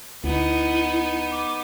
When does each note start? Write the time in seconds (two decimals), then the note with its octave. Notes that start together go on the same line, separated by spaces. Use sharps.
0.24 D2 B3 D#4 E4
1.32 D6